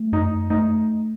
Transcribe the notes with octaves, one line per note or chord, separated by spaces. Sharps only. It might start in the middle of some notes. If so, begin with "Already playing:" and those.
Already playing: A3
F#2 D#4
A3 D#4